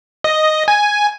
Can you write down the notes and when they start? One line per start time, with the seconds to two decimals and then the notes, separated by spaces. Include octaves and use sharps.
0.24 D#5
0.68 G#5